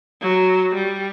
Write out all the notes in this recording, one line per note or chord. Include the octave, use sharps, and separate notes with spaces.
F#3
G3